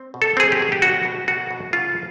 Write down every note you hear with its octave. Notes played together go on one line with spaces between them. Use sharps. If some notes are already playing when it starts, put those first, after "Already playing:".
Already playing: C4
B2
A4
C4 G#4
G4
B2 G#4
G4
B2 F#4
B2
B2 F#4
B2
C#3 F4